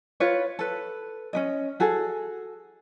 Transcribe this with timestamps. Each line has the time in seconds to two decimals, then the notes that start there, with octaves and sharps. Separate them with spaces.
0.20 F4 B4 C#5
0.59 A4 B4
1.33 C#4 D4 D#5
1.80 F#4 G#4 A4